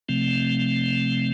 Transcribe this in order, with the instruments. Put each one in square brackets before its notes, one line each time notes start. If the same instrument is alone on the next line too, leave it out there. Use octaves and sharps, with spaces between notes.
[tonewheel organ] C3 F3 A3 C4